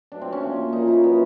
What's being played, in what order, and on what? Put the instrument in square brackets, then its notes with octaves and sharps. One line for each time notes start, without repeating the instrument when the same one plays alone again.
[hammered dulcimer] B2 F#3 A3 D4
C4
C#4
A#2 F3 A#3
A#2 F3 A#3 D#4
E4
B2 F#3 B3